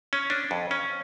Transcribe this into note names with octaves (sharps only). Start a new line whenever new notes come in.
C#4
D4
F2
C#4